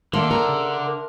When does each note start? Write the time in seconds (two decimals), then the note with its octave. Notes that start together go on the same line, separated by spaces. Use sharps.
0.13 D3 D#3 A#3 E5 A5 C6
0.31 A#4 A#5
0.49 C#3
0.87 A#4